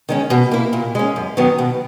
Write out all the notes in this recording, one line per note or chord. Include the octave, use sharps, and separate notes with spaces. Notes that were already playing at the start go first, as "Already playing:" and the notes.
D#3 G#3 C#4
B2
A#3 E4
A#2
G#3 C#4
F#2
D#3 F#3 B3
B2